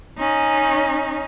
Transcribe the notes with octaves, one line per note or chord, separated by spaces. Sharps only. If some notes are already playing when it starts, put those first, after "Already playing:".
C#4 D#4